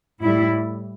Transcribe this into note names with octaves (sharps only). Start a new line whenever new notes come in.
A2 G3 E4